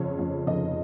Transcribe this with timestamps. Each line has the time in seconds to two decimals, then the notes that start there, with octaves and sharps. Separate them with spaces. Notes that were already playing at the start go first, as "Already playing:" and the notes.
Already playing: F2 C#3 C#5
0.19 F2
0.47 F1 D#5